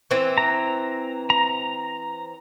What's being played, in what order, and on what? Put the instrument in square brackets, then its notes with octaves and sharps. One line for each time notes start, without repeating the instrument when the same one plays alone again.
[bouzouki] E3 C4
[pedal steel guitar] A#5
A#5